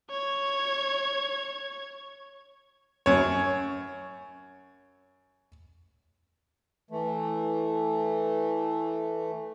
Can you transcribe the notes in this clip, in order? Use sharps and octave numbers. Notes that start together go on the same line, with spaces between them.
C#5 G#6
F#2 C#5
E3 A3